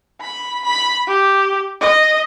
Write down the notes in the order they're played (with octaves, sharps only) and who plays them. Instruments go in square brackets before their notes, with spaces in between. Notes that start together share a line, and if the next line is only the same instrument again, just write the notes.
[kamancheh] B5
B5
G4
D#5